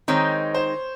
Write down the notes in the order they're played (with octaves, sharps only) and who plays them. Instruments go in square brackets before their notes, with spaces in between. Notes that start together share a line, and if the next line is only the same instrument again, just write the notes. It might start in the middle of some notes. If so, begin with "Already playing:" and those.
[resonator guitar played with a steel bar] D#3 G#3 C4 D#4 [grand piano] C#5
[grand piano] C5